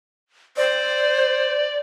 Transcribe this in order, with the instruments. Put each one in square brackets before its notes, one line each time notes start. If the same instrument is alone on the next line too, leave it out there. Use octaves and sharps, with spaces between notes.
[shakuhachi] C5 [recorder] D5